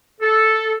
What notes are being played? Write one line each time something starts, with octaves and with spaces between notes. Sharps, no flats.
A4